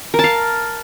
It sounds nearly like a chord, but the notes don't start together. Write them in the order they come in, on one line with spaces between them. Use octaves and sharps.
A#4 A5 F5